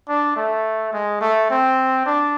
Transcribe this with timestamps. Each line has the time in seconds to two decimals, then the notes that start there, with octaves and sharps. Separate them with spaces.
0.09 D4
0.36 A3
0.93 G#3
1.20 A3
1.50 C4
2.06 D4